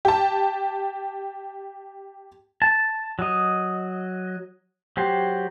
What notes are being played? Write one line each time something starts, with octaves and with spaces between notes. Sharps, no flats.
G4 A5
A5
F#3 D#5
F#3 G4 C5